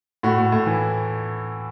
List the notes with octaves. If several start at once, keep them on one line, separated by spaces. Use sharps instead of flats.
A2 F#4
A2
A2
E3